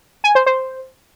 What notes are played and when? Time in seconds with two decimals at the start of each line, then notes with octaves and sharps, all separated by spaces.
0.24 G#5
0.35 C5
0.46 C5